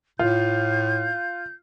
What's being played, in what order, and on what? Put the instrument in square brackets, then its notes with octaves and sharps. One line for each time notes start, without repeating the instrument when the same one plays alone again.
[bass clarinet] A2 [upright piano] F4 [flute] G6